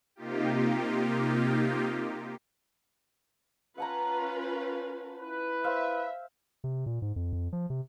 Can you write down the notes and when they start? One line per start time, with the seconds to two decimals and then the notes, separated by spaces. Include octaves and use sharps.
0.16 C3 A#3 D#4 F4 G4
3.78 C#4 F4 B4 F#5 A5 A#5
5.20 E4 B4
5.64 C5 E5 F5
6.64 C3
6.86 A#2
7.02 G#2
7.16 F2
7.33 F2
7.53 F3
7.70 C3